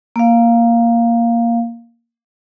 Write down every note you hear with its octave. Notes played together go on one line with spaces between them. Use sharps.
A#3 F5